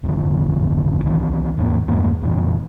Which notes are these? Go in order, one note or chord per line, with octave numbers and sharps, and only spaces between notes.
D#1 G#1 F2 D3
C2 D#3 E3
F1 D#2 G#2 A#3
E2 G2 G#3 A#3
D1 F2 A#2 E3